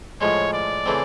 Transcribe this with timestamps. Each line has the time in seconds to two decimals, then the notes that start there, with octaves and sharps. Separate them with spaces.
0.21 A2 F3 G#3 C#5
0.53 D5
0.86 C#3 E3 A3 C4